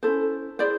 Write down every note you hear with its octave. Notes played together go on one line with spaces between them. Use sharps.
C#4 E4 A4 C5
E4 G#4 C5 D5